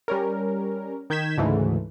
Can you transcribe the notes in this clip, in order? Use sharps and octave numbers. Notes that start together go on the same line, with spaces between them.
G3 C#4 A#4
D#3 G6 G#6 B6 E7
D2 G#2 C#3 E3 A3